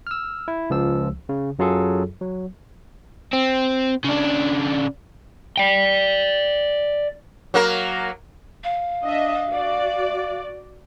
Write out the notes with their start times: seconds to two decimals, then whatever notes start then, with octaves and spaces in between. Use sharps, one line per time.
0.07 E6 F6
0.48 E4
0.70 C#2 F3 E6
1.29 C#3
1.59 F#2 F#3 F4 G#4 A4
2.21 F#3
3.33 C4
4.04 C#3 D4
5.57 D5 G5
7.54 F#3 A#3 A#4
8.64 F5
9.03 D4 D#5 E5
9.50 F#4 D5